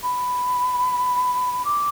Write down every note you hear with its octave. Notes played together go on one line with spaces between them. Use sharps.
B5
D6